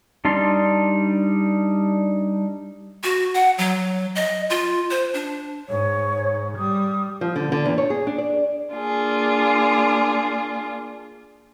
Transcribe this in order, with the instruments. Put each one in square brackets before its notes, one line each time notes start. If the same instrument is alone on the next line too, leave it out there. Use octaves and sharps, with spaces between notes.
[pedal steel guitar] G3 D4 D#4 D5 C6
[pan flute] F#4
F#5
F#3
D#5
F4
C5
D4
[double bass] G#2 [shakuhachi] C#5
[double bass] G3 [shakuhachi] D#6
[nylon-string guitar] F3
D3
D3
E2
C#5
G#4
D4
D5
[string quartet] A#3 D4 F4 G#4